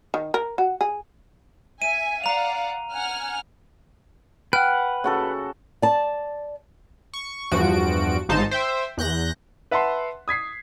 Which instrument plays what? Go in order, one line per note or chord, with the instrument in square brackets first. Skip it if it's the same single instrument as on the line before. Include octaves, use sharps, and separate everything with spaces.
[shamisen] D#3
A#4
F#4
G#4
[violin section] E5 G#5 [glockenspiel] D#7
[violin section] D5 F5 F#5 [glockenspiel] A#5 F7
[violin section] F#5 G#5 F6
[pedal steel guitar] B4 F#5 [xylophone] G5 F6
[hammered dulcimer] C#3 F#4 A4
[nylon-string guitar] D5 A5
[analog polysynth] C#6
E2 G2 F3 F#4 D7
G#1 G#2 D#4 C5 A5
C5 E5 G5
E2 F#6 G6 A#6
[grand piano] B4 E5 F#5 A5 B5 C6
D#6 G#6 B6 C7